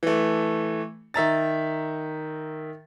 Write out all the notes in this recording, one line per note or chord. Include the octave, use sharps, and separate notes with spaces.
E3 A3
D#3 E5 A#5 A6